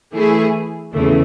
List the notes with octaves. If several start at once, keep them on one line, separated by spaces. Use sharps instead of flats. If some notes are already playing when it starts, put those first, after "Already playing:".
E3 A3 E4 G#4
E2 C#3 E3 A3